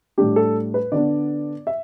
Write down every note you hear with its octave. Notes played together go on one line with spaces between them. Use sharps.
A2 G3 D4 G4
A4
B4
D3 B3 D4 D5
E5